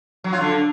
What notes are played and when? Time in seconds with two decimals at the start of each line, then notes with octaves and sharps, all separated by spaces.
0.24 F#3
0.33 F4
0.41 D3